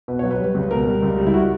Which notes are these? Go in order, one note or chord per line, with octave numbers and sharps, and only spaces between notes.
B2 B4
F#3 C#5
B4
G3
C#2
B2 A#4
G3
C#2
G3
E4
F#4